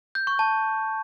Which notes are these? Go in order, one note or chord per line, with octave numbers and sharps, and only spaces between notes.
G6
C#6
A5